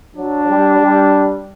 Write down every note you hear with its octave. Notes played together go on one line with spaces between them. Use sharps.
F#3 D4
G3
G3